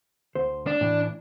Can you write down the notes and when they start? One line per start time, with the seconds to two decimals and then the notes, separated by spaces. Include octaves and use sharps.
0.35 D2 C5
0.67 D4
0.81 A2 E3